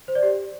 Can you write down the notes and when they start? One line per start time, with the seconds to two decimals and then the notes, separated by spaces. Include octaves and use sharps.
0.08 C5
0.15 D5
0.23 G4